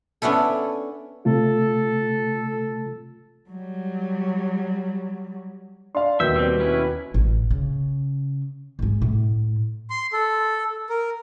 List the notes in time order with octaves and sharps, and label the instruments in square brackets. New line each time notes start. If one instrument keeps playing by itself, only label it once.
[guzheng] B3 C#4 D4 E4 A4
[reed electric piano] C3 A3 F4 [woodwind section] A4
[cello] F#3 G3
[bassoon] D4 [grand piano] F5 C6
[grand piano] D#2 G6 [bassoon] B2 [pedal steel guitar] E5
[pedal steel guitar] G3 C4
C#4 E4 B4
[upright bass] A1
C#3
G#2 G#3
A2
[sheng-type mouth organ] C6
A4
A#4